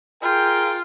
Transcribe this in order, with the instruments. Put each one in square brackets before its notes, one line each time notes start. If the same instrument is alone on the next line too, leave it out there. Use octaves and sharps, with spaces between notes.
[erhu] F4 [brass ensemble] G#4 A#4 G5